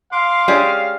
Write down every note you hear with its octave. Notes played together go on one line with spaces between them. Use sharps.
F5 C6 D6
G#3 C#4 G4 D5